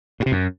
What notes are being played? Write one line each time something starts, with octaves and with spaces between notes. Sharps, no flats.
A2
C3
F#2